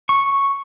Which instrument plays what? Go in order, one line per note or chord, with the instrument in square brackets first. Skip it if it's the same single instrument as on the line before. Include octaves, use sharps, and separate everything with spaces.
[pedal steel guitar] C#6